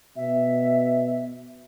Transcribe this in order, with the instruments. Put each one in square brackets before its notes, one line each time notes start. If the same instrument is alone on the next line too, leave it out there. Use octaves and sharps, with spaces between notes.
[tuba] B2 [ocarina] E5